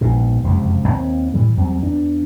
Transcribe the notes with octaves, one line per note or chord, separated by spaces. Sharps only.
A#1 G#2 B2
F1 C#2 F#2 C3
D#2 C4
A2 E3 G3
E2 F#3 G3 C4
E2 D4